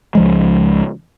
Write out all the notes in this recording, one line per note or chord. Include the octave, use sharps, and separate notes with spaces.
C#2 F3 G#3